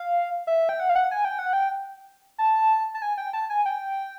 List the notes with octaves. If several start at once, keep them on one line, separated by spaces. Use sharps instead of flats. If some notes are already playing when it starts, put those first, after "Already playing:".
Already playing: F5
E5
G5
F#5
F5
F#5
G#5
G5
F#5
G5
A5
A5
G#5
G5
A5
G#5
G5